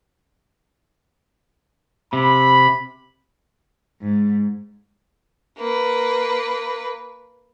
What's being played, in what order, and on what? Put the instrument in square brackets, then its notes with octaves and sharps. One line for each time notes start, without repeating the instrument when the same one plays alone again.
[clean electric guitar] C3 [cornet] B5
[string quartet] G#2
[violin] A#3 B4